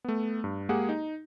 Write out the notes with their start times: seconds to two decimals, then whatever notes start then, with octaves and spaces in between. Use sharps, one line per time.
0.05 A3 B3
0.44 G2
0.69 G#3 A#3 G4 G#4 F#5
0.89 D#4